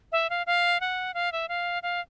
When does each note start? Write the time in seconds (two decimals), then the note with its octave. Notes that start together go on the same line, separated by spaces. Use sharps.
0.12 E5
0.30 F5
0.47 F5
0.80 F#5
1.14 F5
1.32 E5
1.49 F5
1.83 F5